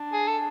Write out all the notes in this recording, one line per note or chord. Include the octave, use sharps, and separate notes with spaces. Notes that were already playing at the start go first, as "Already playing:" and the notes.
Already playing: D4
G#4
A4